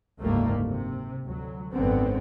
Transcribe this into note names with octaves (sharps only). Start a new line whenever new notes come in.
F#1 D2 G#2 G3 A3 A#3
C3
D2 F#3
G#1 F#2 D3 B3 C4